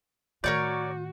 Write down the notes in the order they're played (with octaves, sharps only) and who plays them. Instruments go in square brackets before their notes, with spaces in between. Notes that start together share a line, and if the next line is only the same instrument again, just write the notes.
[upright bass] A2 D#3 [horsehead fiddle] F#4 [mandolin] A#4 C#5 D5 [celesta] G6